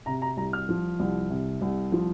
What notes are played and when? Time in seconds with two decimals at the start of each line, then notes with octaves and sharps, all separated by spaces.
0.06 C3 A#5
0.22 A#5
0.37 C2 A#5
0.53 F6
0.69 F3
1.00 C2
1.30 C3
1.62 C2
1.92 F3